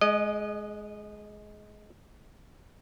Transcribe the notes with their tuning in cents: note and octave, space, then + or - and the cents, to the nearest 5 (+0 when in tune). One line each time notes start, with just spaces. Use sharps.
G#3 +15 D#5 -20